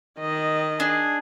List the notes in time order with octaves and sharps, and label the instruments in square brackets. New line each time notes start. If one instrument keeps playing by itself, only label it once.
[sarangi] D#3 [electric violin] D#5
[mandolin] D4 [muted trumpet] G#4